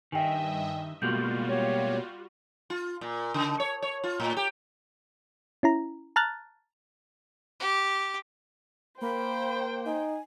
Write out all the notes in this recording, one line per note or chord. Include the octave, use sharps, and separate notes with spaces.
G2 D#3 D#5 E5 G5 G#5
B2 G3 G#3 A#3 F4 F#4 G6
G4 C#5
F4
A#2
C#3
C#5
C#5
F4
A2
G4
C#4 E4 A#5
A5 A#5 F6 F#6 A6
G4
A#3 C5 G5 B5
D#4 G#5